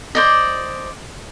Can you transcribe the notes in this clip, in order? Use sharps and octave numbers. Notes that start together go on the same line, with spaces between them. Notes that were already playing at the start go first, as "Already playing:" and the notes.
C5 D5 D#5